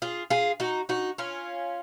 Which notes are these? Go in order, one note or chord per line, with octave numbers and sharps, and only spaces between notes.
F4 G#4
F4 G#4
D#4 F#4
D#4 F#4
C#4 F4